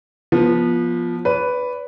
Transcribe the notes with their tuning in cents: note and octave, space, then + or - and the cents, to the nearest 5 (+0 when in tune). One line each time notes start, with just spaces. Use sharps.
F3 +0 B3 -25
B4 +5 D5 -40